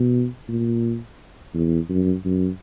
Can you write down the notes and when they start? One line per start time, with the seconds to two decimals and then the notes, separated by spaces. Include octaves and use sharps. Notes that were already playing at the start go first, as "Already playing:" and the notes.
Already playing: B2
0.48 A#2
1.54 E2
1.90 F#2
2.25 F#2